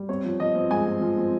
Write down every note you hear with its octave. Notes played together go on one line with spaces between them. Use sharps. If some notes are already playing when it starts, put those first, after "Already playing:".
Already playing: G3
C4 C#5
F3
F3 D#5
C4
G#3 G#5
C4
F3
C4